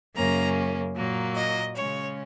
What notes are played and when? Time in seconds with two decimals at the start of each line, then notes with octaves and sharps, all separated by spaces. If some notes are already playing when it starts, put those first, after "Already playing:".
0.16 F#2 C#3 A#3 C#4 A#5
0.96 A#2 F#3 A#3
1.36 D#5
1.76 C#3 G#3 C#4 C#5